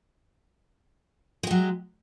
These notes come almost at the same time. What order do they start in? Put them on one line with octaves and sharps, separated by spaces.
G#3 G4 F#3